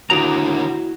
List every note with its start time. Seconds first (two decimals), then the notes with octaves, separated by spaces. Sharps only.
0.10 D#2 D3 E4 F#4 A#5